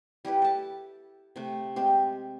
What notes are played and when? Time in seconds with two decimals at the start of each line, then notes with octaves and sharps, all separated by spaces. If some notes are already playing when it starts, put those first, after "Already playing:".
0.25 G3 E4 G4 B4
0.42 A4 A5
1.36 C3 A3
1.76 G#3 C4 G4